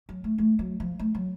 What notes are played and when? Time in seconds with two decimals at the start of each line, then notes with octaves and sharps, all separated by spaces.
0.09 F#3
0.24 A3
0.38 A3
0.59 F#3
0.80 F3
0.99 A3
1.15 F#3